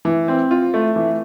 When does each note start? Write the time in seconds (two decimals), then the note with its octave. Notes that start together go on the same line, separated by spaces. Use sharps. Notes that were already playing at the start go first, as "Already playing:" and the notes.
0.05 E3
0.28 C4
0.51 F4
0.74 A3
0.96 E3